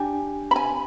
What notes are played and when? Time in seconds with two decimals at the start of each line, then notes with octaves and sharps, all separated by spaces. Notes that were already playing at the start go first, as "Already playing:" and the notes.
Already playing: D4 G4 G#5
0.51 B5
0.56 G#5